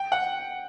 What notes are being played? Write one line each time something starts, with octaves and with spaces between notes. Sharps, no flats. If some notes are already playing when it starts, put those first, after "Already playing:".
Already playing: G5
F#5